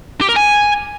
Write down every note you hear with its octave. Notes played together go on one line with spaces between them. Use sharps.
G4
A#4
G#5